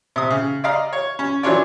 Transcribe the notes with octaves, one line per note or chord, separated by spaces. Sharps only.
C3 D#6
C#3
D5 D#5 F5 A#5
C#5
C#4
E3 F#3 D4 F4 C#5 D5